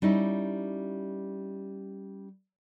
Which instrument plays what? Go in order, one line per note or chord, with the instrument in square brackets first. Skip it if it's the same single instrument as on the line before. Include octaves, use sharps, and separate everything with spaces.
[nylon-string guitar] G3 C#4 D#4 E4